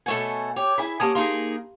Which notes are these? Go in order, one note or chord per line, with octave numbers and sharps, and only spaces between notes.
B2 A3 A4 C#5 F#5 G#5
G4 C#5
E4 G#4 E5 B5
A#3 C#4 G4 F#5 A5 D#6 G#6
A#3 D#4 G#4 F5 C6